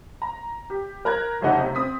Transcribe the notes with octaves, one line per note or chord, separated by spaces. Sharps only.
A#5
G4
A#4 A#5 F#6 G#6
F#1 F2 C3 A3 D#4 F#5
C3
C4 D#6 B6